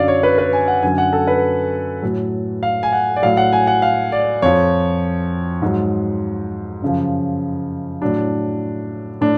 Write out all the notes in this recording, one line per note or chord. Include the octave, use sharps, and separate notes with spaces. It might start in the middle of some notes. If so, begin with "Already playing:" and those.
Already playing: F#2 D3 F#3 D5 F5
C#5
B4
B4
G#5
F#5
F#2 D3 F#3 G#5
F#5
A4
B4
A2 F#3
F5
G#5
F#5
D5
A2 F#3 F5
F#5
G#5
F#5
F5
D5
F2 F3 C#5
G#2 F#3
F#2 C#3 F3
A2 F#3 D4
A2 D4